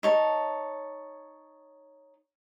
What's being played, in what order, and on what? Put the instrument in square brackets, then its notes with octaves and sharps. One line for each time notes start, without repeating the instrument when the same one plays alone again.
[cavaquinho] D#4 C#5 A5